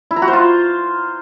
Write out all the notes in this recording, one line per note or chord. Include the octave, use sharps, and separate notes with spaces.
E4
A#5
F#4
C5
F4